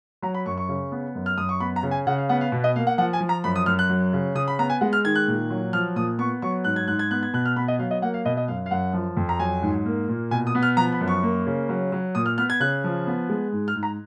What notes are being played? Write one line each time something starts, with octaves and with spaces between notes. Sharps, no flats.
F#3 A#5
B5
F#2 C#6
C#6
C#3
B3
F#2
F6
F#2 D#6
C#6
B3 B5
A#5
C#3
G#5
C#3 F#5
F5
B3 F#5
F5
B2
D#5
A#3 F5
F#5
F3 F#5
G#5
F3
A#5
F#2 B5
D#6
F#2 F6
F#6
F#3
C#3
C#3 D#6
B5
B3 A#5
G#5
G#3 F#5
F6
D#3 G#6
F#6
A#2
F#3
F3 F6
A#2 D#6
B3 C#6
F#3 C#6
G#2 F#6
G#6
G#2 F#6
G#6
B3 F#6
G#6
B2 F#6
F6
B3 B5
D#5
F#3 F5
D#5
A#3 F#5
F5
B2 D#5
D#5
F#2 F5
F5
F#2 F#5
F3
F2
A#5
F#3 G#5
G#2
A#3
A#2
B2 G#5
D#6
B3
F6
F3 A#5
B5
F#2
C#6
A#3
C#3
F#3
F#3
A#2 D#6
F6
B3 F6
G#6
C#3 F#6
F3
B3
G#3
G#2
F6
G#2
A#5